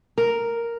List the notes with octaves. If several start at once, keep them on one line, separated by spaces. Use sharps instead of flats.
A#4